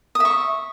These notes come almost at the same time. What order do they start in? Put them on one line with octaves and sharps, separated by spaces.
D#6 E5 C#6